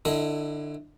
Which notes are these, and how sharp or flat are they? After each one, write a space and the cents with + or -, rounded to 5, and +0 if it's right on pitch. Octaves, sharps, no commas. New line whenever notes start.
D3 +25 E4 +0 D#5 +25